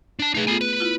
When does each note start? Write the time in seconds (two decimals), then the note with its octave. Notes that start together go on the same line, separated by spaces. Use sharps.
0.19 D4 A5
0.35 A3 D#4 G#4 B4
0.47 B3 F4 A4 G#5
0.61 B4 F#6
0.81 E4 F4